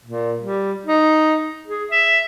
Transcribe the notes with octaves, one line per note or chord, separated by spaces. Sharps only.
A#2
G3
D#4
G#4
E5